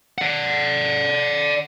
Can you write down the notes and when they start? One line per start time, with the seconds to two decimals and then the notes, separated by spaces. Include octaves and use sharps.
0.18 D5 F#5